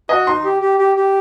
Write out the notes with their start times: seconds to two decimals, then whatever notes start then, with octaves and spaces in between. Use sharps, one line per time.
0.09 F#4 D#5
0.27 D#4 C6
0.44 G4
0.61 G4
0.78 G4
0.96 G4